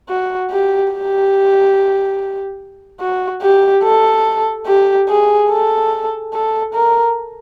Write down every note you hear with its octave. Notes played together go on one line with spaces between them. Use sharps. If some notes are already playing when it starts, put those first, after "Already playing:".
F#4
G4
G4
F#4
G4
A4
G4
G#4
A4
A4
A#4